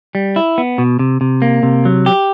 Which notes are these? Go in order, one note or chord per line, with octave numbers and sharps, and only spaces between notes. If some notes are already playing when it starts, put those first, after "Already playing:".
G3
E4
B3
B2
C3
C3
A#3
C3
F#3
G4